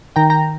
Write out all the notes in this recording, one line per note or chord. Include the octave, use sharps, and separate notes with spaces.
D#3 G5 A#5
G5 A#5